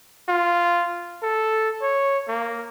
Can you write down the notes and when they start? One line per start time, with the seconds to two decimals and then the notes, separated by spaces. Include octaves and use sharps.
0.29 F4
1.23 A4
1.82 C#5
2.28 A#3